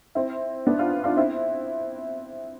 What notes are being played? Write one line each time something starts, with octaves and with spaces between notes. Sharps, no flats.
C4 E4
B3 D4
D4 F4
D4 F4
C4 E4